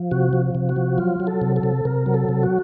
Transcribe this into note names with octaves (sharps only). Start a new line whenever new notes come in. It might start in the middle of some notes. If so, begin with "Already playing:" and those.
Already playing: F3
C3 F#4
F3
C3
F#4
F3
F#3 F4
F#3
A4
C3
A4
C3
C3 A#4
F#3
A4
C3
F#4